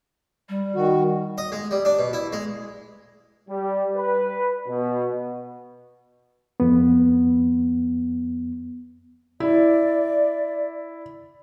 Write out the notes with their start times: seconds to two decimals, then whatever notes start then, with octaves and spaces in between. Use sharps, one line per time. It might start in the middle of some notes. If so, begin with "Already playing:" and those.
0.49 G3
0.75 D#3 F#4
1.38 D#5
1.52 G#3
1.71 G3
1.85 D4
1.99 B2
2.13 E4
2.33 G#3
3.49 G3
3.96 B4
4.68 B2
6.60 F2 B3
9.40 E4 D5